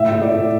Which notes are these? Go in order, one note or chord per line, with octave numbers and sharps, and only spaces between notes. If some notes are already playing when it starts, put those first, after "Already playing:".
Already playing: A2 E5
A2
D5
A2